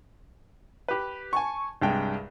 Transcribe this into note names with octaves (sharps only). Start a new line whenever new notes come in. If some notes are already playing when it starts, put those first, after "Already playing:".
G4 B4
G#5 A5 C#6
C2 G2 G#3 G5